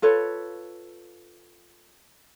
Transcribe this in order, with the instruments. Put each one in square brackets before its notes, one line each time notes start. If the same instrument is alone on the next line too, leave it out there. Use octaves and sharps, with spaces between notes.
[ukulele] F4 A4 B4 C#5